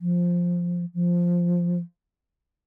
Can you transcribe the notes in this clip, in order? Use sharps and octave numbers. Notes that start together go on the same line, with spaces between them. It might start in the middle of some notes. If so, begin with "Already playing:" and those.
F3
F3